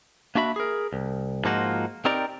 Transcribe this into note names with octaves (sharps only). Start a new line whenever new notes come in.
A#3 D4 F#4 E5 B5
G#4 A#4
C2
G#2 F3 A#3 D#4 F4 F#4
C4 D#4 G4 A#4 D5 A#5